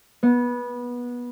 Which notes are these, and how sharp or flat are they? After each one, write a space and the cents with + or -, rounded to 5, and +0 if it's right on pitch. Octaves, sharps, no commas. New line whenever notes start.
B3 -20